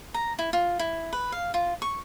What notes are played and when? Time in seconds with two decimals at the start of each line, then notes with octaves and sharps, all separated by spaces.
0.14 A#5
0.39 E4
0.53 F4
0.79 E4
1.13 B4
1.32 F5
1.54 F4
1.82 C#6